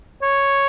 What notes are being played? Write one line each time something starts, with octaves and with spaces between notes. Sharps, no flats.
C#5